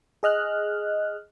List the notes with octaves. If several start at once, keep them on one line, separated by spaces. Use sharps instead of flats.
G#4 D#5 F6 F#6